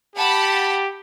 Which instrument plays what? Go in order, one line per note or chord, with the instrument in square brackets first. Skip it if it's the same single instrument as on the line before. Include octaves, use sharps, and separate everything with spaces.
[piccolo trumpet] G4 [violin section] F#5 A5 B5